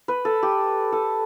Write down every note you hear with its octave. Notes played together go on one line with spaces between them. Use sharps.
B4
A4
G4
A4